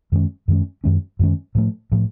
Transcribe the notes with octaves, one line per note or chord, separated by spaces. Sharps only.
F#2 D#3 G#3 C#4
F#2 D#3 G#3 C#4
F#2 D#3 G#3 C#4
F#2 D#3 G#3 C#4
A2 F3 A3
A2 F3 A3